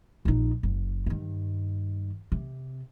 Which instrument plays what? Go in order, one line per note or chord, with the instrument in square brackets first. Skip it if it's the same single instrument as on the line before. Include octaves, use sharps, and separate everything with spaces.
[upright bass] A#1 D#4
F#1
G2 D#3
C3